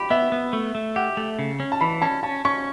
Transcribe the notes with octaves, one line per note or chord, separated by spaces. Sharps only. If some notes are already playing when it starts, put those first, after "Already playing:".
Already playing: G4 B5
B3 E5
B3
A3
A3
G4 F#5
A3
C#3
C#4
A5
E3 B5
C#4 A5
C#4 A5
C#4 C#6